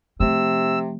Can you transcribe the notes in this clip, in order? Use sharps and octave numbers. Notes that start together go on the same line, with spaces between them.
C3 F3 A3 E6